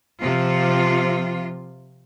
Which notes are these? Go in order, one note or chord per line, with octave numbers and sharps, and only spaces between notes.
C3 F3 F4